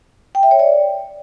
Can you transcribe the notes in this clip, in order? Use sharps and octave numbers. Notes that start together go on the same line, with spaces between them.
G5
E5
C#5
D5